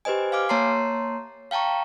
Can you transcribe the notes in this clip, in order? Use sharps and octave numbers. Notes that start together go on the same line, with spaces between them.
G4 B4 C5 D#5 G#5
F5 G#5 D6 F6
A#3 C#5 A5 A#5 C6 C7
F5 G5 A5 A#5 C#6